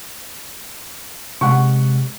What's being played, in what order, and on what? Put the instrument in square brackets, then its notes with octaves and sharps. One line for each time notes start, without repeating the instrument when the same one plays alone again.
[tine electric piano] C3 G#3 [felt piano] F#5 C#6